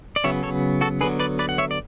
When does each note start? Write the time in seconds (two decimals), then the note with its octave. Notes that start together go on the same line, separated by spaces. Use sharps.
0.16 D5
0.24 C#3 F#3 B3 C#5 E5
0.43 A4 C#5
0.81 F#4 A4
1.01 D3 F#3 B3 G#4 B4
1.19 B4 D5
1.39 B4 D5
1.49 F#5
1.58 C#5 E5
1.71 D5